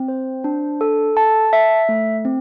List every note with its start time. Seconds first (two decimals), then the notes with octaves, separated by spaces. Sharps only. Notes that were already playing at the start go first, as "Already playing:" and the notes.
Already playing: C4
0.08 C5
0.44 D4
0.81 A4
1.17 A5
1.53 E5
1.89 A3
2.25 C4